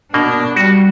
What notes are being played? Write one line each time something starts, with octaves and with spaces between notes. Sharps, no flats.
B2 A#3 D4
G3 F#4